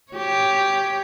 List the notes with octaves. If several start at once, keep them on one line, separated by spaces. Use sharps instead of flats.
G4 C#5